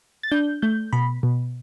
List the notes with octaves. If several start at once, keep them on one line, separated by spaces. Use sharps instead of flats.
A6
D4 G6
A3 G6
B2 B5
B2